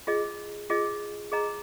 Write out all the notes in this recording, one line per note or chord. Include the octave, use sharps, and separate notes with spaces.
F4 G#4 D#5
F4 G#4 D#5
G#4 D#5 A#5